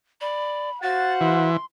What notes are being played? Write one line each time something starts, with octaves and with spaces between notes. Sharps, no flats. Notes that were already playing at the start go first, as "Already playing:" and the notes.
D5 B5
F#4 C5 F5 F#5 A6
E3 C6